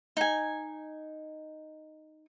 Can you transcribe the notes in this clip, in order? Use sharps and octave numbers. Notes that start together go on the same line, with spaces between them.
D#4 G#5